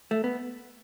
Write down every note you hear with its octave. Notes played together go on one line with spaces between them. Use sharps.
A3
B3